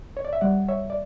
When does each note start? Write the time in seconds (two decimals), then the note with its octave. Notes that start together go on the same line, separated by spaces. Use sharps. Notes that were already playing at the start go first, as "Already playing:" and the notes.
0.17 C#5
0.25 D5
0.33 E5
0.41 G3 D5 F#5
0.68 C#5 E5
0.90 D5